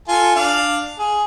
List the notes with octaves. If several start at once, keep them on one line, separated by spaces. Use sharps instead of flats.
F4 A4 G#5
D4 F5
G#4